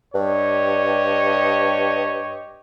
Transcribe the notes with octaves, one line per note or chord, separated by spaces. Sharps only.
G2 G4 C#5 D#5